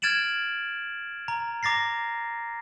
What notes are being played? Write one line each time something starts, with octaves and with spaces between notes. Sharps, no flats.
F6 G#6 A6 D7 E7 F#7
A#5
A#5 D6 A6 A#6 C7